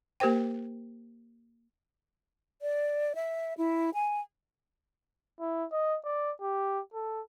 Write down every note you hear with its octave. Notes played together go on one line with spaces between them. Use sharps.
A#3 G4 A#4 C5 G5
D5
E5
E4
G#5
E4
D#5
D5
G4
A4